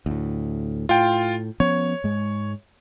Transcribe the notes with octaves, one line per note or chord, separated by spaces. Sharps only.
D2 A2
A2 F4 G5
F3 B3 C#4 C#5
G#2 G#3